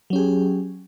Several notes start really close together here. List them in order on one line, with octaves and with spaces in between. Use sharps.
F#3 C#4 G4 G#4